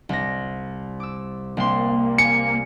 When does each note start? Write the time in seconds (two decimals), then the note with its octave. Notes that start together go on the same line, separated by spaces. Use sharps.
0.09 C2 A#6
1.00 D6 E6
1.57 C2 A#3 C4 C6
2.18 G#5 C#7